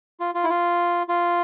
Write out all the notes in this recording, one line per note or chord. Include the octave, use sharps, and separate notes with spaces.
F4
F4
E4
F4
F4